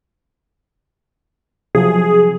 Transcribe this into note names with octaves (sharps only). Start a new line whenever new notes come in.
C3 F3 F#3 G#4